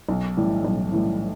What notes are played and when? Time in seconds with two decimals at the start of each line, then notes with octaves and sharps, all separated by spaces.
0.09 B1
0.37 A2 E3 G3
0.64 B1
0.92 A2 E3 G3